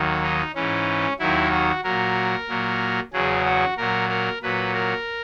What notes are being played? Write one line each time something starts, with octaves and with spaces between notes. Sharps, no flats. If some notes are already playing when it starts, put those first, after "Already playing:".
Already playing: D#2 D#3 F#3
D#4
G#2 E3 C#4
D#2 D#3 F#3 E4
F#4
A#2 F#3 A#4
A#2 F#3
E2 C#3 F#3 G#4
F#4
A#2 F#3 A#4
A#4
A#2 F#3 B4
A#4